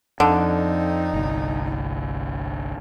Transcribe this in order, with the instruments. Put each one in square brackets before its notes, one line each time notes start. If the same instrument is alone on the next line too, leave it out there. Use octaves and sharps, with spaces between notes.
[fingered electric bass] F2 [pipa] D3 [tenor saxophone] D#4
[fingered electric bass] G1 C2